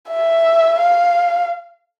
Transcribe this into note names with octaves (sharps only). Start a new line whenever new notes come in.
E5
F5